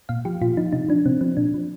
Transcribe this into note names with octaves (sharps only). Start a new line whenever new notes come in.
A#2 F5
F3 G4
A#2 F4
F3 D#4
C3 D#4
F3 D4
C3 C4
F3 C4
A#2 D4
F3